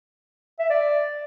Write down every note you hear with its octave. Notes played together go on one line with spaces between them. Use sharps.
E5
D5